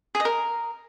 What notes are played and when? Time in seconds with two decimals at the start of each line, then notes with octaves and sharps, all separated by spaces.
0.15 G#4
0.20 D#5
0.25 A#4